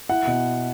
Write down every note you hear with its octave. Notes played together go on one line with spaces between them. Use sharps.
E4 F#5
B2